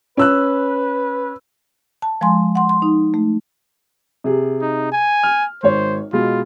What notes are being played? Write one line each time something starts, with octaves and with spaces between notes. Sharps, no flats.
C#4 B4 E6 F#6
A5
F3 G#3 G#5 C6
F#5 C6
C6
D#4
A3
C3 G#4
D#4
G#5
F6
G#1 C5 C#5
B2 G#3 F4